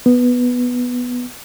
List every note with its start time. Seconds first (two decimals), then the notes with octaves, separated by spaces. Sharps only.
0.06 B3